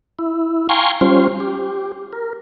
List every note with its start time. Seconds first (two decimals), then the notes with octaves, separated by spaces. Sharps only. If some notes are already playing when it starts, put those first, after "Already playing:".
0.19 E4
0.69 F5 G5 G#5 A#5 C6 C#6
1.01 G3 C#4 F4 C5
1.40 G4
2.13 A#4